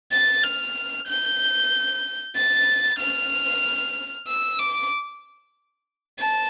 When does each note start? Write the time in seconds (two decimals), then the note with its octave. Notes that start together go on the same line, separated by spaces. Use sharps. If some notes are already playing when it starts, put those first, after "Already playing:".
0.12 A6
0.43 F6
1.08 G6
2.35 A6
2.99 F6
4.27 E6
4.59 D6
6.19 A5